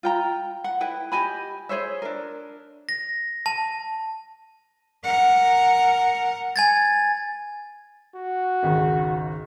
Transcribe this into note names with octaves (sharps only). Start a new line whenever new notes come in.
F4 G5 A#5
F#5
E4 B4 G5
G4 D#5 G#5 B5
G#4 C5 C#5 E5
D4 A#4
A#6
A5
A#4 F#5
G#5 G#6 A6
F#4
G#1 C#2 D#3